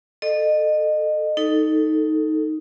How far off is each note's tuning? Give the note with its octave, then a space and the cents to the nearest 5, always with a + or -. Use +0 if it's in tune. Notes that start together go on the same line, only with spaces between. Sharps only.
A4 +0 D#5 -30
D#4 +5 A4 +0